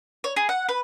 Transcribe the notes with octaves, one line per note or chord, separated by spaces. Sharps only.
C#5
G#4
F#5
B4